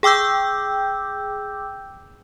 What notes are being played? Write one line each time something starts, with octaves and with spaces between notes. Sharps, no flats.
G#4 G5 D6 E6 G6